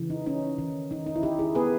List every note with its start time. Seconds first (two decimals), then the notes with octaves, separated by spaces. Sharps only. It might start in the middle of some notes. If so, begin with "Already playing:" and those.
Already playing: C#3 E3
0.10 D#4
0.26 C#4 D#4
0.58 D#3
0.91 D#3 D#4
1.06 D#4
1.16 E4
1.23 D#3 D#4 G4
1.39 E4 G#4
1.55 B3 G#4 B4